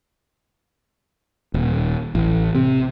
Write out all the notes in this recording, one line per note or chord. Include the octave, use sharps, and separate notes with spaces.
D#1
A1
C3